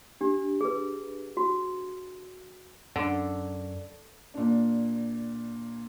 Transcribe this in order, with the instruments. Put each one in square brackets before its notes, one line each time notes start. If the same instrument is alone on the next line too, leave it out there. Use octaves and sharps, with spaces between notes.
[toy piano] D4 G4
G#4 B4
F#4
[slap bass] F#2 [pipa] D3
[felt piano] A#2 D4